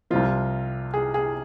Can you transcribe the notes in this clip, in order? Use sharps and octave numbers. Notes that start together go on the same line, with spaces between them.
C2 C3 F3 F4
G#4
G#4